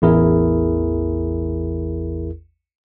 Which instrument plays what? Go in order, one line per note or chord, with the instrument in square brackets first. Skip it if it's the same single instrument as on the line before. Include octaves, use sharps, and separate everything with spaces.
[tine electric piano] A1 E2 E4 G#4 A#4